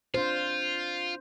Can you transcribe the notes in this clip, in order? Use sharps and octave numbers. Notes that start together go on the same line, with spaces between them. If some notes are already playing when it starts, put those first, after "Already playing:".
D4 F4 C5